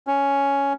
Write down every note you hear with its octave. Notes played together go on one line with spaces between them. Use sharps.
C#4